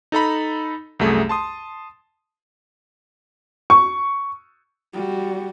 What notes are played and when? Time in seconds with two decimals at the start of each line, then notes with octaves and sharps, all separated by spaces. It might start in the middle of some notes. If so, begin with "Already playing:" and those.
0.12 D#4 A4 A#5 B5
0.99 C2 F#2 A3 G#4
1.29 A5 C6 D#6
3.70 C#6
4.93 G3 F#4